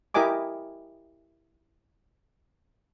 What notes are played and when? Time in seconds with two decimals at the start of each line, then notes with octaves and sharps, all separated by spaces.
0.14 E4 G4 A#4 D#5 G#5 D6